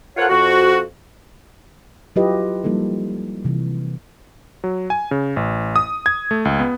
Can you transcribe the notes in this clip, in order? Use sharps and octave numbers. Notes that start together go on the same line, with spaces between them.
F4 A4 A#4 C5 C#5 F#5
F2 F#4
F#3 E4 F4 G4 B4 D#5
F3 G3 A#3 D#4 A4
C3 E3
F#3
G#5
C#3
A1
D#6
G#6
A3
C#2
B3